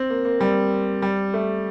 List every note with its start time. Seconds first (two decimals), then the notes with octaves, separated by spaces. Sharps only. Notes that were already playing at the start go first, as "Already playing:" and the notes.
Already playing: C4
0.10 A#3
0.25 A#3
0.41 G3
1.02 G3
1.34 A3